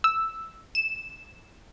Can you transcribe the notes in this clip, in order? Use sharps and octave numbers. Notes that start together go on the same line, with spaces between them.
E6
E7